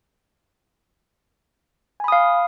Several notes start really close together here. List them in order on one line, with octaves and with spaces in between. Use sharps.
G#5 B5 D#6 F5